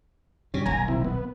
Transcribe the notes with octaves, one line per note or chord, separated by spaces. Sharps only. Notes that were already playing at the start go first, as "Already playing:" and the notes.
G2 B2 C#4
D#1 B1 G#5 A#5
C3 E4
B3